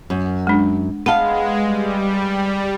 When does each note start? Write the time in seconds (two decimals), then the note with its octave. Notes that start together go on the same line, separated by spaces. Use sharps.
0.10 F#2
0.47 G#3 D4
1.06 G#3 B3 F5 F#5 A5
1.61 G3